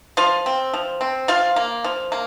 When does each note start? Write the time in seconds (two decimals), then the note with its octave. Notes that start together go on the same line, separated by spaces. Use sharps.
0.17 F3 F4 F5
0.46 C4
0.74 F3
1.01 C4
1.28 F3 F4 F5
1.56 A#3
1.84 F3
2.12 A#3